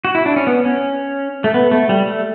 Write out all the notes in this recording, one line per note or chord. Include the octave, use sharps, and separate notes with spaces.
F#4
E4
D4
C#4
B3
C#4
A3
B3
A3
G3
A3